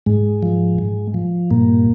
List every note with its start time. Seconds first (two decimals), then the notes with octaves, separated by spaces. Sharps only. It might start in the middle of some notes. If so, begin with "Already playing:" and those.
0.06 G#2 G#3
0.43 F3
0.78 G#2
1.14 F3
1.51 G2 A#2 A#3